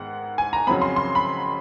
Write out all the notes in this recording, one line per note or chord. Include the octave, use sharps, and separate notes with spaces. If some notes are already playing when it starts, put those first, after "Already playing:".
Already playing: G#2 D#3 G#3 B3 F#5
G#5
A#5
F2 C#3 F#3 B5
C6
C6
B5